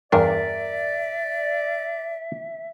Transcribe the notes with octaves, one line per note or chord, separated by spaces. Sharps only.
E2 G2 D4 A#4 D5 E5